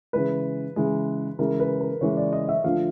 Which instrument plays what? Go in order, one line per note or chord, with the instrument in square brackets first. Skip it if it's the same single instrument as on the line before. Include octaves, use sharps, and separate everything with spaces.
[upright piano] C#3 E3 G#3 [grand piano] B4
[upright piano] C#3 E3 G#3
[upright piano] C#3 E3 G#3 [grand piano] A#4
[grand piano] B4
A#4
[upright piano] C#3 E3 G#3 [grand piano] C#5
[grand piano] D5
D#5
E5
[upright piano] D3 F3 A3 [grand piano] F5